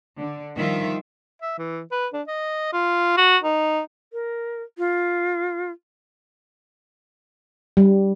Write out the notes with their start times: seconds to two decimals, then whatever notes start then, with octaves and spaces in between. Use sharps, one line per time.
0.19 D3
0.57 D#3 F3 G3 F4 E5
1.42 E5
1.58 E3
1.92 B4
2.13 D4
2.28 D#5
2.73 F4
3.17 F#4
3.43 D#4
4.13 A#4
4.78 F4
7.77 G3